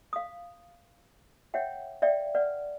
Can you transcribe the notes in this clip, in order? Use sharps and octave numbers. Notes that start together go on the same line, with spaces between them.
F5 D#6
C#5 E5 F#5 G5
D5 E5 F5 G5
B4 D5 F#5